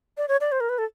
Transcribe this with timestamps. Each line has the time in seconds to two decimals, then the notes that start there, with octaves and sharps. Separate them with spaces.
0.17 D5
0.28 C#5
0.41 D5
0.52 C5
0.60 A#4
0.69 B4
0.78 A4